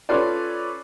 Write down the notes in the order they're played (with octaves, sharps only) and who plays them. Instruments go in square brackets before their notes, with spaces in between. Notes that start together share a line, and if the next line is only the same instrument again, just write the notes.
[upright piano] C#4 F4 A4 B4 D5